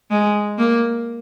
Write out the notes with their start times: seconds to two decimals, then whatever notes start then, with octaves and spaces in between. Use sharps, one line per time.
0.11 G#3
0.58 A#3